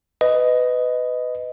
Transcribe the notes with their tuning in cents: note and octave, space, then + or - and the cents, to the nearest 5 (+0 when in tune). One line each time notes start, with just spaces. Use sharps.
B4 +20 D#5 +0